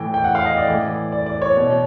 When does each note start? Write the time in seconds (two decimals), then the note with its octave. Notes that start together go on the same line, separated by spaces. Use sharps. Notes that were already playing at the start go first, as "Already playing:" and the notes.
Already playing: A2 E3 G5
0.14 G5
0.24 F#5
0.35 F5
0.46 D#5
0.57 D5
0.68 A2 E3
1.12 D5
1.26 D5
1.42 C#5
1.56 B2